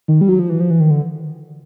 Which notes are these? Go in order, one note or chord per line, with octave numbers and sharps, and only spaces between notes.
D#3
G3
F#3
F3
E3
F3
E3
D#3
D3